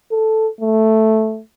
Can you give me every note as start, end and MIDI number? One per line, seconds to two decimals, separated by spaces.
0.12 0.48 69
0.61 1.40 57